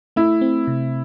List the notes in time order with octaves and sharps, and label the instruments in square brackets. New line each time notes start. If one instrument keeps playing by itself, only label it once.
[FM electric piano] A3 [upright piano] E4
[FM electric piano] C4
C3